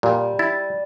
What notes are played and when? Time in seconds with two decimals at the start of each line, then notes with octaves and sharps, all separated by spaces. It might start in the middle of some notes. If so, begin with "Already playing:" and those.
0.03 A#2 G3
0.39 E4 A6